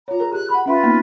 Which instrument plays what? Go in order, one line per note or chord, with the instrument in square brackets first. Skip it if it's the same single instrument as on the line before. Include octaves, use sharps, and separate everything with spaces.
[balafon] F4 C#5 [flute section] A#5
[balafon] G#4 A#4
[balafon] G4 G#4 [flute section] F#6
[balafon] G#4 F#5 [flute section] B5
[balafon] C#4 E5 C6 [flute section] F4 B4
[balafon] A#3 B3 D#4